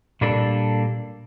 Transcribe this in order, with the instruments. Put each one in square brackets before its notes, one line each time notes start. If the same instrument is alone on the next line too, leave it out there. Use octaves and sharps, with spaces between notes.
[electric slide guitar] A#2 G3 A#3 D4 A4